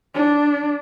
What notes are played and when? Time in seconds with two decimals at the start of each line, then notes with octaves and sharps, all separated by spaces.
0.15 D4